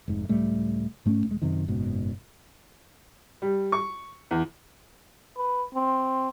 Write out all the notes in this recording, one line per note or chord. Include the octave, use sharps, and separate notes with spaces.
F1 G#2
C#2 A2 G3 A3
G#2 A3 C4 C#4
E1 G#3
F#2 C3 D#3
F#1 G#2 B2
G3
C#6
E2
B4
C4